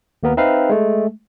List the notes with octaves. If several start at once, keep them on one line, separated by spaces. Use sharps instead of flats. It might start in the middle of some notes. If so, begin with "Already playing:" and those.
D#2 A#3 B3 A#4
C4 D#4 B4 E5 F5
G#3 A3